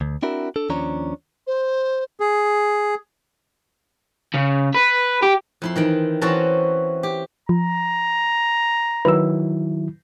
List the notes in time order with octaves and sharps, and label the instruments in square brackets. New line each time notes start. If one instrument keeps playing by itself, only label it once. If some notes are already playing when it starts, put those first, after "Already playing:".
[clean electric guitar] D2
C4 D4 E4 F#4 A#4
D4 A4
D#2 F3 C#4 D4 C#5 A#5
[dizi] C5
[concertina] G#4
[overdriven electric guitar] C#3
B4
G4
[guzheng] F2 E4 C6
D#3 E3 G5
E3 C4 C#4 F#4 A5 A#5
G4
[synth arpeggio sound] F3 [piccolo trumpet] A#5
[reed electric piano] D#3 F#3 E4 [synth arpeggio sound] B4 E6